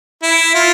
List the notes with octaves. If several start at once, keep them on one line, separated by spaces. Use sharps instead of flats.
E4
F4